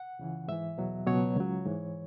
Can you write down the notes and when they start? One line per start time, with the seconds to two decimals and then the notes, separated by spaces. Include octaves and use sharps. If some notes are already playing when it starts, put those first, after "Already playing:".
Already playing: F#5
0.19 C#2 C#3 E3
0.48 G#2 E3 E5
0.78 E2 B2 F#3
1.06 C#2 B2 F#3 C#5
1.37 C#2 C#3 F#3
1.66 G#2 E3